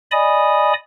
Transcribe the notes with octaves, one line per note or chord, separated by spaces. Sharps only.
D5 D#5 G#5 B5 D#6